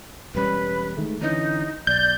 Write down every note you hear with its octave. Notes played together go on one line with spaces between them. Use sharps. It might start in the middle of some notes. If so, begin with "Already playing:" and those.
E1 G3 C#4 B4
D#3 G#3 A3
D3 E3 C#4 D#4
B1 D5 G6